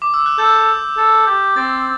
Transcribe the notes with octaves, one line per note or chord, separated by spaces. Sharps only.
D6
E6
F#6
A4 G6
A4
G4
C4 A6